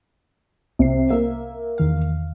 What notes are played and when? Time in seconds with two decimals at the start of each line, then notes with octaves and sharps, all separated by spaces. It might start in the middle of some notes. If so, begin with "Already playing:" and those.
0.79 C2 C3 C7
1.10 A#3 E5
1.78 E2 D#3 F5